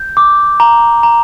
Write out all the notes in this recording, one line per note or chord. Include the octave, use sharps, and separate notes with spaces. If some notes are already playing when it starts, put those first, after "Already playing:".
Already playing: G6
D6
A#5
A#5